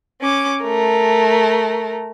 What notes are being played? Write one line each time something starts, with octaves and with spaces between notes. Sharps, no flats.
C#4 D6
A3 A#4